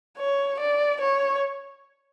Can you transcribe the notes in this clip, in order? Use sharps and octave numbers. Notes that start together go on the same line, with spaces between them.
C#5
D5
C#5